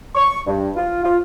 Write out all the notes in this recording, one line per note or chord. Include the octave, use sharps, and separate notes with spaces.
C#6
G2
F4
F4